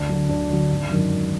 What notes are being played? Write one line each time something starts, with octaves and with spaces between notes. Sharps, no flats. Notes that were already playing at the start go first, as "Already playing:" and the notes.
Already playing: D2 D4
D3 F#3
D2 D4
D3 F#3
G#1
F#2 D#3 F#3
G#1